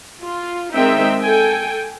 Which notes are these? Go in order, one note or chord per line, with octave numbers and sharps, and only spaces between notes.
F4
D#3 G#3 C4 D#4 E5 G5
A4 G5 G#5